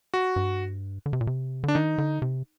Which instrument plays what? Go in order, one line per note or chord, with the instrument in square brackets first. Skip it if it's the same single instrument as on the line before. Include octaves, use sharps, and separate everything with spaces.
[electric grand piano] F#4
[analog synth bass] G2
D3
C3
A#2
C3
[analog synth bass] D3 [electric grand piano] D4
[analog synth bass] D#3 [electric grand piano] D#4
[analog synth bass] D3
C3